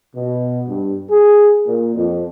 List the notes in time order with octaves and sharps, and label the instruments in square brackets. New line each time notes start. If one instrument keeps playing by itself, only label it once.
[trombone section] B2
G2
G#4
A#2
F2